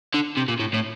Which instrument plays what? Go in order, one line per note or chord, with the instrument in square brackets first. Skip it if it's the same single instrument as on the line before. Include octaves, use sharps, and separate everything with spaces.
[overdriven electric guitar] D3
C3
A#2
A2
A2